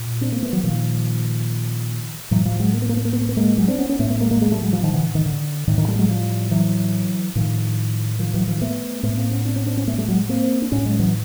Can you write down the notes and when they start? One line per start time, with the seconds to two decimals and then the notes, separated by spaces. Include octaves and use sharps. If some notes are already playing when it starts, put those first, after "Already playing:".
Already playing: A#2
0.21 C4 D4
0.32 A#3 C4
0.42 A3 B3
0.53 E3 F#3
0.64 A#2 D#3 F3
2.31 A2 E3 F#3
2.45 F3 G3
2.60 F#3 G#3
2.73 A#3
2.82 B3
2.89 A#3
2.97 B3
3.05 A#3
3.13 B3
3.21 A#3
3.29 B3
3.37 G#3 A#3
3.58 F#3 G#3
3.68 C4 D4
3.78 B3 C#4
3.89 B3 C#4
3.99 A2 A3 B3
4.10 A3 B3
4.20 G#3 A#3
4.31 G#3 A#3
4.41 G#3 A#3
4.52 G3 A3
4.62 F#3 G#3
4.73 F3 G3
4.83 D#3 F3
4.94 D3 E3
5.15 D#3
5.26 D3
5.67 A2 D#3
5.78 D#3
5.88 G3 A3
5.99 F#3 G#3
6.09 F3 G3
6.51 E3 F#3
7.35 A2 D#3 F3
8.19 D#3 F3
8.34 E3 F#3
8.47 D#3 F3
8.61 A3 B3
9.03 A2 A3 B3
9.17 A#3 C4
9.31 B3 C#4
9.45 C4 D4
9.56 B3 C#4
9.66 C4 D4
9.77 B3 C#4
9.88 A3 B3
9.98 G3 A3
10.08 F#3 G#3
10.29 A#3 C4
10.62 D4
10.71 A2 B3 C#4
10.85 F#3 G#3
10.99 E3 F#3